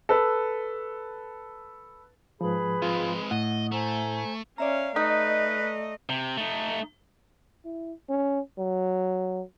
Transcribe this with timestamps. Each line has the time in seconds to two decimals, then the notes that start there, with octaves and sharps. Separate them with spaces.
0.09 A4 B4
2.41 G#2 F3 G#4 B4 B5
2.82 G#3 C4 F4
3.31 A2 D#5 F#5
3.72 A3 C5 G#5 A#5
4.58 C#4 D5 E5 F5 A#5
4.96 A3 D#4 B4 D#5
6.09 C3
6.37 A3 D#4
7.65 E4
8.09 C#4
8.59 F#3